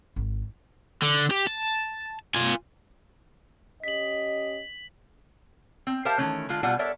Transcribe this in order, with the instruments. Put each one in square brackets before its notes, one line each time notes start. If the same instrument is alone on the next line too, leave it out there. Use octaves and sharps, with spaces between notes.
[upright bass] G#1
[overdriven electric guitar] D3
G4
A5
F4 G#5
[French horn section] C#4 G4 D#5 [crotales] B6 F#7
[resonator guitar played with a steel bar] C4
G4 A#4 C5 E5 F5 A5
D#3 E3 A3 C#4
D3 G#3 F4
B2 G3 F4 D5 F#5 G#5
A4 A#4 C#5 D5 E5